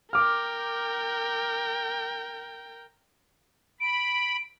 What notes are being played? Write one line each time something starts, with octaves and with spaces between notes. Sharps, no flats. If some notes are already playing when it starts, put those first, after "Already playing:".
A#4 G5 D6 F6
B5 D7